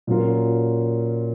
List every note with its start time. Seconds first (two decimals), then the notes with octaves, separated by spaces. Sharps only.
0.07 A#2 F#3 C#4 F4 A#4